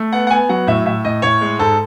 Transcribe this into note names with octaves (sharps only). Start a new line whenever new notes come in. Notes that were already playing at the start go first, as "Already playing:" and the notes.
Already playing: A3
B3 F#5
F#5
B3 G#5
F#3 F#5
A2 E5
A2 E5
A2 D#5
A2 C#5
G#3
G#2 A4